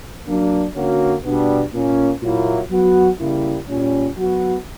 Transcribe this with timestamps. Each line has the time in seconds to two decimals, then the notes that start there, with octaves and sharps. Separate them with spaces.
0.27 F#3 A#3 D4
0.75 D3 A#3 C#4 F#4
1.25 B2 G3 B3 D4
1.73 A#2 A#3 C#4
2.22 A#2 F#3 A#3 E4
2.70 F#3 B3 F#4
3.20 C#3 G3 A#3 E4
3.69 A#2 G3 C#4
4.18 F#3 B3 F#4